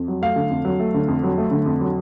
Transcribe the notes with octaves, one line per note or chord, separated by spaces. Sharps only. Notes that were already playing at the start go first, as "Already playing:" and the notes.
Already playing: F2
F#3
A3 F5
D3
F2
F#3
A3
D3
F2
F#3
A3
D3
F2
F#3